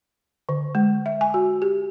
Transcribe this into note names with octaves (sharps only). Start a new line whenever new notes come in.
D3
G#3
E5
G#5
F#4
G4